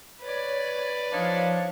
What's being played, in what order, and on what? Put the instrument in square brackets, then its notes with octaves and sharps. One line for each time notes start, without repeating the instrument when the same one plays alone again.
[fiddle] B4 D5 [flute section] C#5
[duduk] F3 [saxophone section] D4 D#4 C#5 [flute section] F5